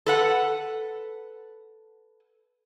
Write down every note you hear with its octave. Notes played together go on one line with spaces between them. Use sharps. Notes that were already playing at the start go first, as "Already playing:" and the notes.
A4 B4 F#5